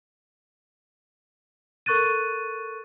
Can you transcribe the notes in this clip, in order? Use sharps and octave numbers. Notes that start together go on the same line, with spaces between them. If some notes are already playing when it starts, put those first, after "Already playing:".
A4 A#4 C#6 F#6 A6 D#7